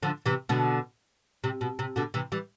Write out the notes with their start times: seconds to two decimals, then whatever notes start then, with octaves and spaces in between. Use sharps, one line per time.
0.03 D3 F3
0.26 C3 E3
0.49 B2 D3
1.44 C3
1.61 B2
1.79 C3
1.96 B2 D3
2.14 C3 E3
2.32 E3 G3